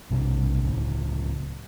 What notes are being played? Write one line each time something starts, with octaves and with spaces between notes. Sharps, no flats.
B1 C3 F3 D4
C#2 A2 C#3